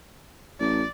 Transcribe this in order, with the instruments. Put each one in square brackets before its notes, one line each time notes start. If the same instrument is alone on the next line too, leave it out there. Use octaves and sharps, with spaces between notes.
[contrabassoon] A1 [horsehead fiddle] D5